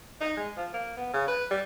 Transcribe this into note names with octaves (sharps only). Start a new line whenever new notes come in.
D#4
G#3
F3
A#3
B3
C#3
B4
G3